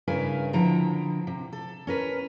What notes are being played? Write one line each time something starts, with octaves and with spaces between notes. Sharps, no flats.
G2 C#3 E4 A#4 B4 G#5
D3 F3 E4 G5 A#5
C3
A4
C#4 A#4 B4